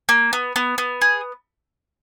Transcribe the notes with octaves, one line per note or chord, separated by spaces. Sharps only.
A#3
B3
B3
B3
G#4